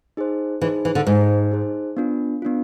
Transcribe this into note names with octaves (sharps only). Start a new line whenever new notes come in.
D#4 G#4 C5
E3 D#4 G#4 C5
E3
D3
G#2 D#4 G#4 C5
D#4 G#4 C5
B3 D4 F4
B3 D4 F4